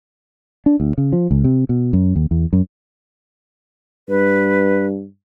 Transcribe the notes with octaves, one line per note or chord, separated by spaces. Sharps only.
D4
D2
C#3
F3
C#2
C3
B2
F#2
D#2
E2
F#2
G2 B4